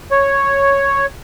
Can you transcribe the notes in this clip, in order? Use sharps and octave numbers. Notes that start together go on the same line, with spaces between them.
C#5